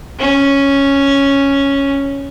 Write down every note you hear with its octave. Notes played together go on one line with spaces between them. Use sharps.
C#4